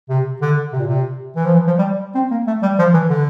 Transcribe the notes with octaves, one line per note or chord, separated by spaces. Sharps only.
C3
D3
C3
A#2
C3
E3
F3
E3
F3
G3
C4
A#3
A3
G3
F3
E3
D3